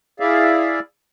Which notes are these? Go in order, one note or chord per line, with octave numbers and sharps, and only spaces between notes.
E4 G#4 D5 E5 F5